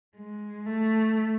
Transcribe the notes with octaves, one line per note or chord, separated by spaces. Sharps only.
G#3
A3